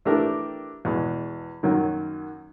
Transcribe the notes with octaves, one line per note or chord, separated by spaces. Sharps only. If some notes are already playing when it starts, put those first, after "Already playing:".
E3 A3 D4 G4 A#4
E2 B2 G#3
F#2 D#3 F#3 A#3